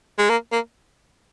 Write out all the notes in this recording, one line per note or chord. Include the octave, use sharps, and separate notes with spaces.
G#3
A#3
A#3